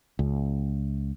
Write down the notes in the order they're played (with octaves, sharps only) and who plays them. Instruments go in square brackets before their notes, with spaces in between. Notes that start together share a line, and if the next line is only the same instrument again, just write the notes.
[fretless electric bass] C#2